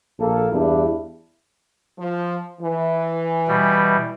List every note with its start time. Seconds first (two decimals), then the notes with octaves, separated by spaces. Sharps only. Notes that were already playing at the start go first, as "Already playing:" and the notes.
0.19 A#1 A#3 A4
0.52 E2 G2 D4 E4
1.98 F3
2.61 E3
3.48 B2 G3